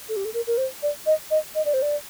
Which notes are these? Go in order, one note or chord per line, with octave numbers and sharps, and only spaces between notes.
A4
G4
A4
A#4
A#4
C5
D5
D#5
D#5
D#5
D5
C5
D5